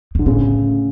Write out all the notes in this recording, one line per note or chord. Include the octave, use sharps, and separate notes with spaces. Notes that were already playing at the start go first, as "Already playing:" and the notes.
B2 D3
A2 C#3